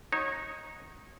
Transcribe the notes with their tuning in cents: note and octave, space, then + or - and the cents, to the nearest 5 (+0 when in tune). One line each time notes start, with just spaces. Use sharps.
D#4 +0 F#4 +0 C#5 -25